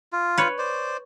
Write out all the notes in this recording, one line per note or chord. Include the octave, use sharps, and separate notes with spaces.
F4
B4 C#5
C5 D5